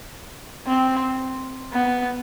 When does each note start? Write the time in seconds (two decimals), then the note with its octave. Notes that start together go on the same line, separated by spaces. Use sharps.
0.67 C4
1.73 B3